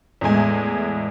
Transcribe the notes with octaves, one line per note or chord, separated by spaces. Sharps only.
E2 A2 G#3 G#5